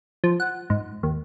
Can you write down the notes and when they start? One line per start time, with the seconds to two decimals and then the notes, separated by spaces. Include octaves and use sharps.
0.24 F3
0.40 F#5
0.70 G#2
1.03 D#2